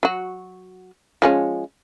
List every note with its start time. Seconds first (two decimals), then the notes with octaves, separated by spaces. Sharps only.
0.03 F#3 F#4
1.22 F3 G#3 C#4